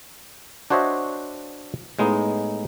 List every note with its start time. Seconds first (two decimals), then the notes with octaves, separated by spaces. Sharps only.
0.70 D4 F#4 C5 C#5 D#5 E5
1.99 A2 G#3 B3 D#4